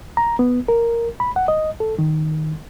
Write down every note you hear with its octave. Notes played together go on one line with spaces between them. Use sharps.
A#5
B3
A#4
B5
F#5
D#5
A4
D#3